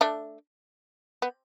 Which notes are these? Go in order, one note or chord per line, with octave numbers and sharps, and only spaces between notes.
A3 D4
B3